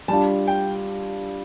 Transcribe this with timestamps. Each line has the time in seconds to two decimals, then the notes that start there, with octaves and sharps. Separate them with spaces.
0.08 G3 D4 F4 A5
0.48 G5